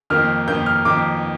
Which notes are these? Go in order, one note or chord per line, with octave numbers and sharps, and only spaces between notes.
F2 D#3 A#3 F6
F2 D#3 A#3 G6
F6
F2 D#3 A#3 D6